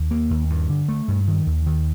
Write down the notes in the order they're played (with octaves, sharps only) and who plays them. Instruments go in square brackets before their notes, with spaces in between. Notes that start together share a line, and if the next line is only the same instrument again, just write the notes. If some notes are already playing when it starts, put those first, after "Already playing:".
Already playing: [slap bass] D#2
A#3
D#2
G2
D3
A3
G2
D#3
D#2
D#3